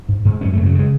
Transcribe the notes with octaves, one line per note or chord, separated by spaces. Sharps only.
G#2
G#2
F#2 C#4
A3
C#3
F#3
C#3 G#3